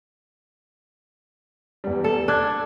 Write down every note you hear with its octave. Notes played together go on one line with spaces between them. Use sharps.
E2 G3
A4
D4 E6 F#6 G#6